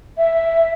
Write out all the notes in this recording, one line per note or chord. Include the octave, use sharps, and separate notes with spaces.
E5